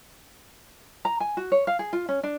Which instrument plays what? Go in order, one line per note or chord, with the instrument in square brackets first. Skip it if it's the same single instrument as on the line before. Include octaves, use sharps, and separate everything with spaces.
[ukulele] A#5
G#5
F#4
C#5
F5
G#4
F4
C#4
D4